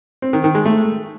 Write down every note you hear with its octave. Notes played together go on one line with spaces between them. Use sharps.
C4
D#3
D#3
G#3
A3